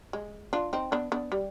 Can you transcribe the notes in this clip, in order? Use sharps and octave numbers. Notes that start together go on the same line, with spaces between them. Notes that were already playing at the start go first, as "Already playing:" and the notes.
G#3
D4 F4
C4 D#4
B3 D4
B3 D4
G3